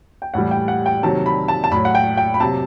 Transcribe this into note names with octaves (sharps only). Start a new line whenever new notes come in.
G5
A2 E3 G3 F#5
G5
F#5
G5
C3 D#3 F#3 A5
B5
A5
A5
A2 F#3 B5
F#5
G5
G5
B5
C3 F#3 A5